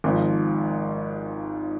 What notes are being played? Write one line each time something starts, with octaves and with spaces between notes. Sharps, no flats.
G#1 G#2 F3